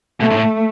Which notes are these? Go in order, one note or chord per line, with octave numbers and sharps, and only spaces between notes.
B2 A3
G#2
A2